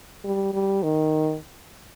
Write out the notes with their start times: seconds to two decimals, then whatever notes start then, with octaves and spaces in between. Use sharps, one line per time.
0.24 G3
0.53 G3
0.83 D#3